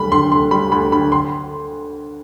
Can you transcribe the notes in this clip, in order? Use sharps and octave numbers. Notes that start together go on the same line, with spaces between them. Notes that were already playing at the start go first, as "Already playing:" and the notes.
Already playing: D2 G3 B5
D3 C6
D2 C6
G3 B5
D2 B5
D3 B5
C6